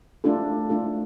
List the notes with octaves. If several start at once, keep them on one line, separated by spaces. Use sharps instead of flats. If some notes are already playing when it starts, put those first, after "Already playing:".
A3 D4 F4 A4
A3 D4 F4 A4